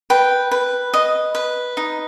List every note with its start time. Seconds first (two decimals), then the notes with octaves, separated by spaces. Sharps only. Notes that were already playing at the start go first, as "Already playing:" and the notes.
0.10 B4 G5
0.51 B4
0.94 D#5
1.35 B4
1.77 D#4